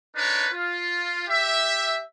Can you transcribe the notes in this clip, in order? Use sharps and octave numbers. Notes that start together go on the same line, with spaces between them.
D4 D#4 A#4 B4 C#5
F4
G4 E5